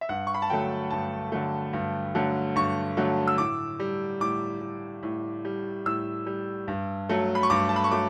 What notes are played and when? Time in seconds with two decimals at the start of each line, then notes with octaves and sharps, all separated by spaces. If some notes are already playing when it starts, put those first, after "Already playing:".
0.01 E5
0.09 G2 F#5
0.27 C#6
0.34 B5
0.42 A5
0.50 D3 F#3 A3 G5
0.90 G2 A5
1.32 D3 F#3 A3
1.73 G2
2.15 D3 F#3 A3
2.56 G2 C#6
2.97 D3 F#3 A3
3.28 E6
3.38 A2 D6
3.80 G3
4.20 A2 D6
4.61 G3
5.03 A2
5.45 G3
5.86 A2 E6
6.26 G3
6.68 G2
7.09 F#3 A3
7.35 B5
7.43 C#6
7.50 G2 D6
7.69 A5
7.76 B5
7.84 C#6
7.91 F#3 A3 D6